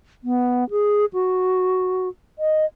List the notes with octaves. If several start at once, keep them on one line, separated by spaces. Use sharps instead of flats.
B3
G#4
F#4
D#5